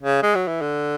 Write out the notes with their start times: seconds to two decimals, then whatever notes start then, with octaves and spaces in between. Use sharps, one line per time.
0.02 C#3
0.23 G#3
0.35 F#3
0.47 E3
0.61 D3